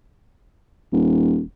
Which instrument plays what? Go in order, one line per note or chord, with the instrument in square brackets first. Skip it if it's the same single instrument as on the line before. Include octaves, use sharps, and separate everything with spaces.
[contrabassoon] D#1